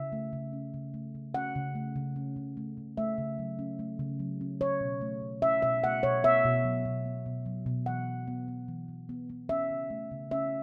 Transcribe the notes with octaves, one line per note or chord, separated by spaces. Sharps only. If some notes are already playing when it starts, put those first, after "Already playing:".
Already playing: C#3 E5
A3
C#3
C#4
C#3
A3
C#3
C#4 F#5
C#3
A3
C#3
C#4
C#3
A3
C#3
A3 E5
C#3
F#3
C#4
A3
C#3
F#3
C#4
C#4 C#5
B2
A3
B2
C#4 E5
B2 E5
A3 F#5
B2 C#5
B3 E5
B2
F#3
B2
B3
B2
F#3
B2
E3 F#5
E3
B3
B3
E3
E3
B3
B3
C#4 E5
C#3
A3
C#3
C#4 E5